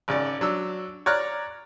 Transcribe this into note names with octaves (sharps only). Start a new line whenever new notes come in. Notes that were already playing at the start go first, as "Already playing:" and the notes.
G#1 C#3 D5
F#3 D4 E6
C#5 D5 A#5 F6 F#6